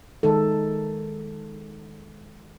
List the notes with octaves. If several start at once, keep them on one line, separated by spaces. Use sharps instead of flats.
D#3 G#3 D#4 A4